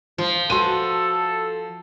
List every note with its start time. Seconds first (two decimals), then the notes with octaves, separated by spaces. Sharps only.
0.18 F3 F4
0.50 F#4 A4 B4 C6 D#7